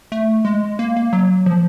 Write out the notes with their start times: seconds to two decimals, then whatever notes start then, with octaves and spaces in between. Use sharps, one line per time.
0.12 A3
0.45 G#3
0.79 A#3
0.97 A#3
1.13 F#3
1.46 F3